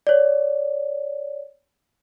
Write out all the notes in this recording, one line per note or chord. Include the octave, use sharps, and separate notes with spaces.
C#5 D5